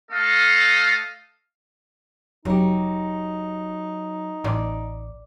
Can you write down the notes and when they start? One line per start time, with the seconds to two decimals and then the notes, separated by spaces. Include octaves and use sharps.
0.11 A3 A4 D#5 F5
2.45 F1 F#3 D#4 G4
4.44 A1 D5